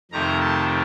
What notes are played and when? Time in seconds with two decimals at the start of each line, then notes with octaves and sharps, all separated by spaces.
0.11 F2 C3 D#3 A3 C4 A#5
0.40 A5